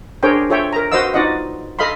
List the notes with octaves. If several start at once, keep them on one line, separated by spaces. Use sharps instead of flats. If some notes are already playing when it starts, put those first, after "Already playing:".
D4 G#4 A#4 C5 C#5 G5
F4 A4 C#5 E5 G5
A#4 A#5
F#4 B4 C5 D#5 F5 E6
D#4 F4 F#4 D5 D#5 F#5
A4 D#5 F5 B5 C6